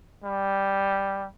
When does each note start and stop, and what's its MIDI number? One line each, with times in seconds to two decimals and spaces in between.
0.24 1.26 55